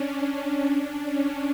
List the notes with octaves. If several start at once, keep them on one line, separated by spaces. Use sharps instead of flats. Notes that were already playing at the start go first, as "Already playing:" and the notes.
Already playing: C#4 D4
C#4
D4
C#4